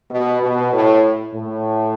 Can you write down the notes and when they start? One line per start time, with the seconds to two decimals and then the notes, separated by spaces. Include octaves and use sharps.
0.11 B2
0.42 B2
0.73 A2
1.34 A2